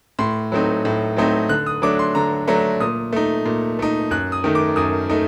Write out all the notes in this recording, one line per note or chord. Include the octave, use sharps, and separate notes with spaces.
A2 C6
F#3 A3 C4 D#4
A2
F#3 A3 C4 D#4
D3 F#6
D#6
F#3 A3 D4 D6
C6
D3 A#5
F#3 A3 D4 A#5
A#2 D#6
A3 D#4
A#2
A3 D#4
F#2 F#6
D#6
D#3 A3 D#4
D6
F#2 D#6
A3 D#4